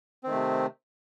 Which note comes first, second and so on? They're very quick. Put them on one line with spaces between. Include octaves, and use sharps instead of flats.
C4 D#3 A3 C3